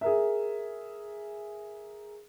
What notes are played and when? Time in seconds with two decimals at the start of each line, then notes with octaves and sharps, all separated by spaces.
0.01 G#4 A#4 E5